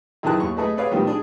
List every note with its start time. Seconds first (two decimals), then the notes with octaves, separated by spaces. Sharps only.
0.23 F#2 D#3 E3 G#4 A5 F#6
0.40 D#2 C#6
0.57 A3 G#4 A4 B4 D#5
0.77 G#4 B4 C#5 D5 F5
0.91 A2 D#3 F3 G3 B3
1.07 D4 G#4